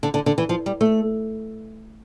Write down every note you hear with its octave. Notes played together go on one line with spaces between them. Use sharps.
D3
D3
D3
E3
F3
G3
A3